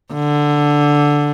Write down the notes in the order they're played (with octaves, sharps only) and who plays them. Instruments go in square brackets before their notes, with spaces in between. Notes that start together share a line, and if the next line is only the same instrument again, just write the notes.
[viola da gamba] D3